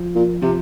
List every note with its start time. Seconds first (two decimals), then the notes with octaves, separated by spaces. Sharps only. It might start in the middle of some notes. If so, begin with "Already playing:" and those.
Already playing: F3
0.15 A#2
0.42 C3 F3